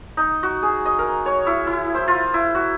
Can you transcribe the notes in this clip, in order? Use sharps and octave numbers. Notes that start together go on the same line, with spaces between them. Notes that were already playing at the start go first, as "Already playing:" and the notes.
D#4
F#4
G#4
D#5
A#4
C#5
E4
E4
C5
F4
E4
F#4